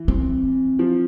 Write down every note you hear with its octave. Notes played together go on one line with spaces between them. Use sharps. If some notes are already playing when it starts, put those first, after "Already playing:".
Already playing: E3
C4
F3